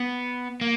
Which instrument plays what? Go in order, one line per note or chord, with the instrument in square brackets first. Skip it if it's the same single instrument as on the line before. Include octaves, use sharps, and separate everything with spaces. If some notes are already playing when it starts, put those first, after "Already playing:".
Already playing: [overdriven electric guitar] B3
A#3